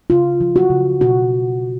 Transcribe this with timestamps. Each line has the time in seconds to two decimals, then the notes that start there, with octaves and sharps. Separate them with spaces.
0.10 C#3 F4
0.41 F3
0.56 F#4
0.70 C#3
1.01 B2 F#4